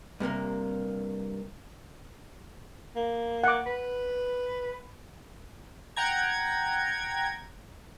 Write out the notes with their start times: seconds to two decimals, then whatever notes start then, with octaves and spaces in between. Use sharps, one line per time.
0.20 G2 C3 A#3 A#4
2.96 A#3
3.44 F#5 D6
3.66 B4
5.97 F#5 G5 A#5 G#6